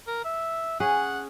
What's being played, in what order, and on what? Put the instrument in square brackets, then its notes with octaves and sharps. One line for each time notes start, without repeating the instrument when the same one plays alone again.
[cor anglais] A#4
E5
[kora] C#4 G#4 [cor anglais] F#5